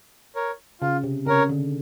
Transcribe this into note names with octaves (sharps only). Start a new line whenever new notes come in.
A#4 C#5
C#3 F4
C3
C#3 A#4 C#5
D3